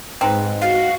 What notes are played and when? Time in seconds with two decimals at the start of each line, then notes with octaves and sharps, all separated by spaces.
0.21 G#2 C4 D#4 B4
0.61 F#4 F5